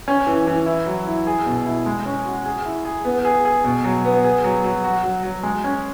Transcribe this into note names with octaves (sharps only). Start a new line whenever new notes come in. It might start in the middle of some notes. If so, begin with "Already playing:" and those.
C#4
E3
E3
E4
F#3
E4
G#4
B2
E4
G#3
C#4
F#4
G#4
E4
G#4
B3
G#4
G#4
B2
F#3
B3
G#4
F#3
F#3
F#4
F#3
F#3
G#3
C#4